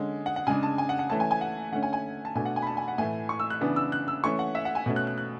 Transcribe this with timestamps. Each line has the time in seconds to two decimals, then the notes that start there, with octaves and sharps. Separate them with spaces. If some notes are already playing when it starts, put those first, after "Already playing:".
Already playing: D3 G#3 C#4
0.26 F#5
0.36 F#5
0.47 C#3 G#3 D4 G#5
0.63 A5
0.78 G#5
0.89 F#5
0.99 F#5
1.10 E3 A3 C#4 A5
1.20 G#5
1.31 G#5
1.41 F#5
1.72 D3 A3 C#4 F#5
1.83 G#5
1.93 G#5
2.25 A5
2.35 B2 A3 D4 G#5
2.45 F#5
2.56 G#5
2.62 B5
2.67 A5
2.77 G#5
2.88 F#5
2.98 A2 E3 A3 G#5
3.29 C#6
3.40 E6
3.50 F#6
3.61 C#3 E3 B3 D4
3.76 E6
3.92 F#6
4.08 E6
4.24 E3 A3 C#4 C#6
4.39 F#5
4.55 E5
4.65 F#5
4.75 G#5
4.86 B2 A3 C#4
4.96 F#6
5.07 F#6
5.18 F#6